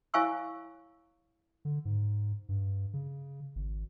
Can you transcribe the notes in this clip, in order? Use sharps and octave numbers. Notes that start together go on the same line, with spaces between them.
E4 C#5 F5 G#5 C#6 E6
D3
G#2
G2
C#3
G#1